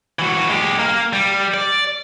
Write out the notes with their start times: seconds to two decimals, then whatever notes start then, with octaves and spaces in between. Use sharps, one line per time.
0.19 E3 F#4
0.50 G#3 G4
0.79 A#3 A#4
1.13 G3
1.54 D5